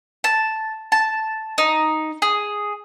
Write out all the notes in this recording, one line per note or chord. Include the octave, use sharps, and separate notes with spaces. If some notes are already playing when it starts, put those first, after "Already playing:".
A5
A5
D#4
G#4